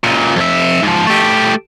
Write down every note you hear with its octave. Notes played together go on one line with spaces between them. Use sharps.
C#2 A#2
F2 E5
G#2 F3
A3 G4